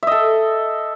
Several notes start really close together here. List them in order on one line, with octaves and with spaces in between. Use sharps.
E5 D#5 A4